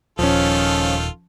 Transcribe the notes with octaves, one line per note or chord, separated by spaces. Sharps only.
D#1 D#3 F3 C#4 F4 A4